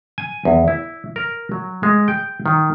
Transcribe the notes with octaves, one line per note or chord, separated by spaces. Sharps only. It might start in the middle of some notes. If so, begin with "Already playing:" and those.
G#5
E2
E4
A#4
F#3
G#3
G5
D#3